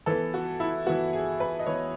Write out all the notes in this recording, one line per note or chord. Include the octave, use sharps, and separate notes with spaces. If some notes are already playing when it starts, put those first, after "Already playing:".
E3 B3 A4
F#4
E4
E3 B3 F#4
G#4
B4
D#5
E3 B3 C#5